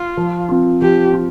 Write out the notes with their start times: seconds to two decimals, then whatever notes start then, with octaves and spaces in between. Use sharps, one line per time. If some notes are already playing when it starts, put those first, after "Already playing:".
Already playing: F4
0.17 F3
0.49 C4 F4
0.82 F3 G4
1.14 F4